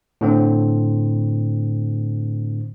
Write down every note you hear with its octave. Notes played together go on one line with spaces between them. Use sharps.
A2 D3 C4